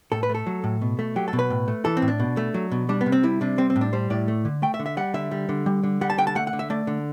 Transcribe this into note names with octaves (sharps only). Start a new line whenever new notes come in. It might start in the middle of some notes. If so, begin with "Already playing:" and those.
A2 A4
B4
A3
A4
F#3
A2
B2
A3
F#3 G4
A4
B2
B4
A2
A3
E3 A4
C4
A2
D4
B2
A3
F#3
B2
G3 D4
B3
C3
C4
G3 E4
C3 D4
G3 C4
C4
A2
D4
G3 C5
A2 D5
A3
D3
A3 G5
E5
D3
E5
G3 F#5
D3 E5
G3
D3
G3
D3
G3 F#5
A5
D3 G5
A5
A3 F#5
F#5
D3
E5
A3 D5
D3